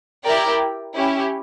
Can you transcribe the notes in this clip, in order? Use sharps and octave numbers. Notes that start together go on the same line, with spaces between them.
E4 G4 A#4 D5 G5
C#4 E4 G4